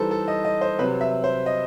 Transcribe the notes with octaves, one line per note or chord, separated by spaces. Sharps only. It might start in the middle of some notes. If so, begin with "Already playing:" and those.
Already playing: E3 G3 D#4 A4 B4 C5
A4
D#5
D#5
C5
C3 F#3 C4 B4
E5
C5
D#5